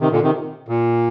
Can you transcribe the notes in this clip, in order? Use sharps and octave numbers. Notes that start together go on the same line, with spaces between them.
C3 D#3
A#2 D3
C3 D#3
A#2